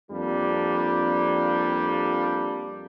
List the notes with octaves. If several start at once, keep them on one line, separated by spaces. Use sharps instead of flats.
F2 G3 A#3 D4